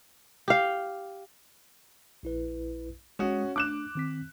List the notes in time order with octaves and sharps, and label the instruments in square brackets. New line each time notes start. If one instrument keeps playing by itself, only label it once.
[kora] G4 F5
[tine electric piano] A#1 E4 B4
[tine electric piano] G#3 D#6 [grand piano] C#4 F#4
[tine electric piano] A3 D4 [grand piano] D6 F#6 E7
[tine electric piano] D#3 C4 B6